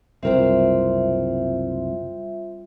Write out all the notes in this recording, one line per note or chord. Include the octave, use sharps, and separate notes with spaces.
F#1 C2 G3 C4 F4 A#4 C5 E5